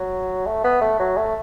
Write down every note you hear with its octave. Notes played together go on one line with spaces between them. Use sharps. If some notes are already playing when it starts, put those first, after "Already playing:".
Already playing: F#3
A3
B3
A3
F#3
A3